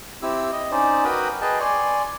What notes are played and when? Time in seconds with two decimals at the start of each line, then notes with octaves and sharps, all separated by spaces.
0.22 C4 E4 G4 E6
0.52 D#5
0.72 C#4 D#4 C5 D5
1.05 F#4 A#4 B4 G5 B5 D#6
1.41 G#4 B4 D#5 G5 A5
1.60 D5 G#5 C6 C#6